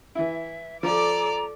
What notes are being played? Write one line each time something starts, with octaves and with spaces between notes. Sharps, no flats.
E3 E4 E5
F3 A4 D5 A#5 D6